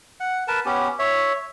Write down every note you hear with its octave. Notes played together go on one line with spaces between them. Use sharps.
F#5
A#4 B4 A5
B3 C#4 G4
C#5 E5